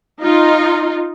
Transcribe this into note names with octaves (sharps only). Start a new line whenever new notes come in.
D#4 F4